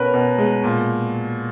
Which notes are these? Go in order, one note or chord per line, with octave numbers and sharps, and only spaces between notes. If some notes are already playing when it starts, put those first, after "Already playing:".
Already playing: B2 C#4 A#4 B4
B2
G#3
A#2